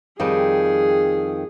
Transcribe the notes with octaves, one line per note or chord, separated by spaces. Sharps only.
F2 D#3 G3 G#4